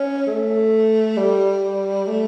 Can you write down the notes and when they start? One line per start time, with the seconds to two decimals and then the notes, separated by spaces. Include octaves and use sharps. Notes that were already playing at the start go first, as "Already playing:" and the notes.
Already playing: C#4
0.27 A3
1.17 G3
2.08 A3